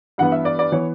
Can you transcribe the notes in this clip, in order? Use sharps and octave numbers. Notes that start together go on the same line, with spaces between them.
G2 E3 B3 F#5
E5
D5
D5
E3 B3 C#5